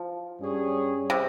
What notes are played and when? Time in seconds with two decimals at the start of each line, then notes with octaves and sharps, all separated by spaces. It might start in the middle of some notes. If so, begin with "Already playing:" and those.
Already playing: F3
0.39 G2 G3 C#4 G#4 C#5
1.10 C3